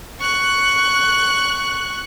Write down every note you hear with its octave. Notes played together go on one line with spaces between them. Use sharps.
C#6 F#6